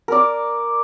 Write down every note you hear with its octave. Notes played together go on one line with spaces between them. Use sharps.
A#4 D5